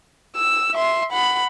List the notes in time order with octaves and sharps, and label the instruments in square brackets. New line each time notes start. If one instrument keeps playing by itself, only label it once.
[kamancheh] E6
E5 C6
F#5 B5